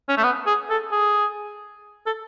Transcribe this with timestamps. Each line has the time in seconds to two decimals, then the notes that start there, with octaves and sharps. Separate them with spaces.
0.09 C#4
0.17 A3
0.23 B3
0.46 G#4
0.70 A4
0.92 G#4
2.06 A4